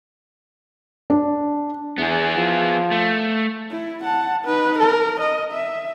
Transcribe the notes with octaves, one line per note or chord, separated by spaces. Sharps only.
D4
E2 B3 G#4
F3
A3
E4
F#5 A5
D#4 B4
A#4
D#5
E5